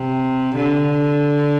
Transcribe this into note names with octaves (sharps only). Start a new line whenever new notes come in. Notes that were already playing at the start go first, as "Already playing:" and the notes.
Already playing: C3
D3